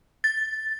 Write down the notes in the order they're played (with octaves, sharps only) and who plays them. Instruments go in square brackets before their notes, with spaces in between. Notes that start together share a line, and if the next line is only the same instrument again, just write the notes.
[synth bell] A6